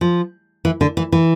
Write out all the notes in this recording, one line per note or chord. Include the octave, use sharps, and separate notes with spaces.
F3
E3
D3
E3
E3